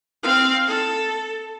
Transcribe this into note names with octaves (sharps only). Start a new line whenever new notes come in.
C4 F5
A4